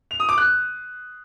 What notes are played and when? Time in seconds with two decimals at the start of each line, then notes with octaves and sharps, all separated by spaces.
0.11 F7
0.20 D#6
0.29 D6
0.38 F#6